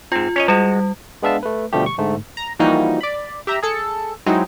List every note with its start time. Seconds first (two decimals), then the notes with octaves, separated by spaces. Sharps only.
0.12 G#2 C4 F4
0.36 C#4 C#5 D#5
0.48 G3 G#3 F#4 A5
1.22 G#3 B3 D4 E5 F5 A5
1.43 A3 B4
1.73 B2 D3 F3 G3 A3 G4
1.86 C#6
1.98 G#2 D3 A3
2.37 A#5
2.59 E3 F3 G3 A#3 D#4 F#4
3.01 D5 B5
3.47 G4 E5 A#5
3.63 G#4 A4 C#7
4.26 F#3 G#3 C4 D#4 E4